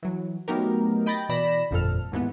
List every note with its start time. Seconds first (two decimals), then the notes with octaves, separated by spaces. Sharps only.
0.03 E3 F#3
0.48 F#3 A3 B3 D#4 G4 A#4
1.06 D#5 G5 B5 G6 A6 A#6
1.29 B2 E3 D5 B5 A#6 E7
1.71 G1 F2 A#2 A4 F6
2.12 D#2 G#2 E3 B3